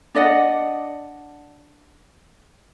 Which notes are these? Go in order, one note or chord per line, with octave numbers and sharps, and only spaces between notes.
D4 D5 D#5 F#5